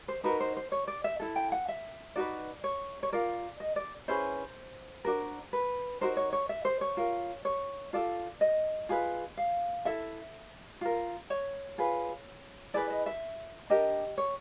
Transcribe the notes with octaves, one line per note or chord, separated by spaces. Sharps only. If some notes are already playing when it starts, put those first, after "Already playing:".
C5
D#4 F#4 A#4 B4
C5
C5
C#5
D5
E5
E4 A4
G5
F#5
E5
D#4 F#4 B4 D5
C#5
C#5
F4 A#4 D5
D#5
D5
C#4 E4 G#4 B4 C5
D4 F#4 A#4
B4
D#4 F#4 A#4 C5
C#5
C#5
E5
C5
C#5
F4 A#4
C#5
F4 A4 D5
D#5
F4 G#4 B4
F5
E4 A4 E5
F4 A#4
C#5
F4 G#4 B4
E4 G#4 B4 D5
D#5
E5
D4 G4 A#4 D#5
C#5